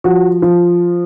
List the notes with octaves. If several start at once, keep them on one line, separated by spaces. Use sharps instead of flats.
F3 F#4
F3